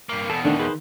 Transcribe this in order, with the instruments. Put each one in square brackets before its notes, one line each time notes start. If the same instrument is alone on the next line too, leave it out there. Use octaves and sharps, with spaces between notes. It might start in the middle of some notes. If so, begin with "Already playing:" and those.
[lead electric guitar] G2 A#3
[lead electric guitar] E2 B2 [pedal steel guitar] A4
[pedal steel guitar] D3 A3 C4 [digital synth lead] D#3 [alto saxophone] D4
[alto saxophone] G#4 [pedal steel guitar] B4 C5